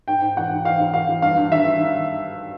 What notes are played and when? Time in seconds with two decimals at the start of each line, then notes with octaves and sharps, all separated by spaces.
0.08 G#2 G5
0.22 G#2
0.36 E3 F#5
0.51 G#2
0.65 E3 F5
0.79 G#2
0.94 E3 F5
1.09 E3
1.22 G2 F5
1.37 G2
1.51 D#3 E5
1.65 D#3
1.79 D#3